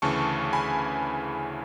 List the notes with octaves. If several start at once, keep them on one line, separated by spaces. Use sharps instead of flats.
D2 C#3 E3 A5 C#6
G#5 B5